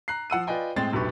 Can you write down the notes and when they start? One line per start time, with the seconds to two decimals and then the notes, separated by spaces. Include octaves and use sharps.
0.08 A#5 F#6 C7
0.30 F3 F#5 E6 D#7
0.47 F4 B4 D5 D#5 G5 G#5
0.76 A2 G#3 C4 A6
0.93 F1 A#1 F#3 G4 B4 C#6